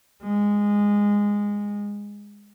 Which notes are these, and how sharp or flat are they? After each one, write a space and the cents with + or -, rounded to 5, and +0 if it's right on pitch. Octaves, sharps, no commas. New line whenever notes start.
G#3 -15